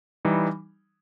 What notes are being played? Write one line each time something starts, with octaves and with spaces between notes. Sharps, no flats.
E3 G3 D#4